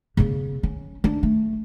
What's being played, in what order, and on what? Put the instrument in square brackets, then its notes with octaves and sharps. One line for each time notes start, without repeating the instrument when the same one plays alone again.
[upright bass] C#3 B3
C#4
D4
A3